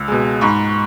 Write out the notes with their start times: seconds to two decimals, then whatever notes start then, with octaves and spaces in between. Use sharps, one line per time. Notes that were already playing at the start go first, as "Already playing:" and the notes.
Already playing: C#2 E6
0.08 B2 G#3
0.41 G#2 B5 C#6